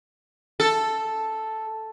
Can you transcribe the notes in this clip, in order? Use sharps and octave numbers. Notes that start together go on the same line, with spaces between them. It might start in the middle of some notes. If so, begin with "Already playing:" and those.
A4